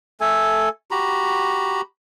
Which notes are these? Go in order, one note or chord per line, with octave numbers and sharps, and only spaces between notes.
A3 A4 G#5
F#4 G4 A#5 B5